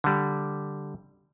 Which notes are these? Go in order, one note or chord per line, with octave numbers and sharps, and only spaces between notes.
D3 G3